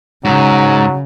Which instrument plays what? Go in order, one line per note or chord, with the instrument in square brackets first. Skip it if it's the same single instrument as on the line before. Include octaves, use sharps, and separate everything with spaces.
[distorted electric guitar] G#2 [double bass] C#3 [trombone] F#3